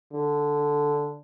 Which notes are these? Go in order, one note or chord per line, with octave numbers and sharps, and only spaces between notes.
D3